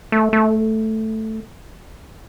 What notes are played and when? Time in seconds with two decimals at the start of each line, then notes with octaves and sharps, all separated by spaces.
0.12 A3
0.33 A3